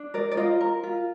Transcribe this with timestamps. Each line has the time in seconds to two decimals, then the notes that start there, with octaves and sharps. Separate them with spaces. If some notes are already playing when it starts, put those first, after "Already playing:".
Already playing: D4
0.14 A#4 D5
0.31 D5
0.37 F4 D#5
0.61 A#4
0.83 F4